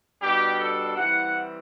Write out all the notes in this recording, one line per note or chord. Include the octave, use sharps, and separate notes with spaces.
B2 G3 D4 G4
A4
E3 G3 C4 E4 F#5